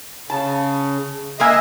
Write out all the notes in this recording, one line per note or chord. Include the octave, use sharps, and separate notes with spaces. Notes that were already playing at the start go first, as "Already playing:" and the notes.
C#3 A5
G#3 A#3 D#5 E5 G#5